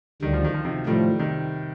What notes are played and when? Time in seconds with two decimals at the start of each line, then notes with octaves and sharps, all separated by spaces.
0.22 D2 D3 D#3 G3
0.33 F3
0.44 D#3
0.54 F3
0.65 C3 D#3
0.87 A2 D#3 F3 G3 A3
1.19 C3 D#3